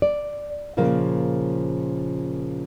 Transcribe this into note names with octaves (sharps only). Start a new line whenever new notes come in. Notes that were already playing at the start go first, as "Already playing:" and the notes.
D5
A#2 C#3 F3 A#3